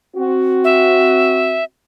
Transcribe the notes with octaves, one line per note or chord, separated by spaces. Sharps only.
C4 F#4
E5